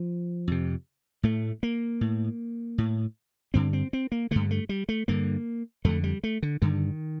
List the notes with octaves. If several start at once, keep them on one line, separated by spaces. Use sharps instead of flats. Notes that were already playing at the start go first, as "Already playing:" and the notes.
Already playing: F3
F2 C3
A2 A3
A#3
A2
A2
G2 D3 C4
C4
C4
A#3
G2 D3 A3
A3
G3
A3
G2 D3 A#3
F2 D3 A3
G3
A3
D3
G2 D3 D#3